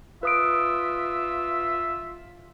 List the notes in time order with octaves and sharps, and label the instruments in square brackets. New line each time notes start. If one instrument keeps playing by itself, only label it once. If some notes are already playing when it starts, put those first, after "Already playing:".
[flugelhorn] F4 [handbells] B4 D#6 D7 [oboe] E5